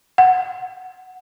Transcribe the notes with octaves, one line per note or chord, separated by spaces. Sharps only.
F#5